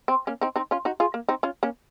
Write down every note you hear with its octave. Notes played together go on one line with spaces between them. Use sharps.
C4
A#3 C#4
C4 D#4
C4 D#4
C#4 F4
D#4 F#4
F4 G#4
A#3
C4 D#4
C#4 F4
A#3 C#4